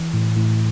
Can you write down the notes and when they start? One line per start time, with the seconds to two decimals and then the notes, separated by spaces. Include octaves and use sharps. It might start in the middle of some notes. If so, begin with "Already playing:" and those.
Already playing: E3
0.14 A2
0.37 A2